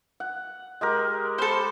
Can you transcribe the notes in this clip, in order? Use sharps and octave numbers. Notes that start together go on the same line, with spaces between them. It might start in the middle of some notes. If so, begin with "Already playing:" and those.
F#5
G#3 G4 A#4
A4 C5 B5